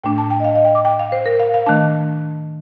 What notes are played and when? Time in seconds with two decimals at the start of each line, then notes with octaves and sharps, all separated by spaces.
0.04 A2 A3 D4 G5
0.18 A5
0.30 G5
0.40 D#5
0.44 F5
0.55 D#5
0.65 G5
0.75 D6
0.85 G5
0.99 F5
1.12 C5
1.26 A#4
1.40 F5
1.54 F5
1.66 D#3 A3 D4 A5